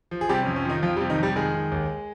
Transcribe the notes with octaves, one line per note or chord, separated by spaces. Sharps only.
F3
G#4
C3 G3 G4
F2 C#4
C#4
D#3 F3 D#4
F2 F3 F4
C3 G3 G4
D#3 D#4
F2 G3 G4
D#3 G#3 G#4
D#3
D#2